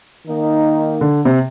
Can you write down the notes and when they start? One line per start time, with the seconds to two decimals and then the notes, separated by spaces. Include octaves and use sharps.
0.26 D#3 A#3 D#4
1.01 D3
1.25 C3